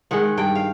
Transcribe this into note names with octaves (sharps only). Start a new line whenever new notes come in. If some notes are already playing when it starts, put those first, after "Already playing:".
D#3 G#3 F#5
G2 G5
F5